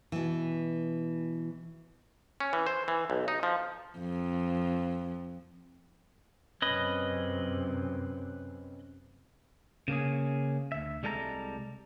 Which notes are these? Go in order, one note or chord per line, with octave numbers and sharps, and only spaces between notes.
B2 E3
C#4
E3
C5
E3
B1
D#4
F3
F2
F#2 C3 C#4 B4 D#5
C#3 A#3 C#4 G#4
D2 E5
C2 G3 G#3 A4 F5 A#5